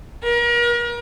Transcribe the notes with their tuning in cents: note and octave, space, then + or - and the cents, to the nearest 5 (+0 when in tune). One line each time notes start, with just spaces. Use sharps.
A#4 +40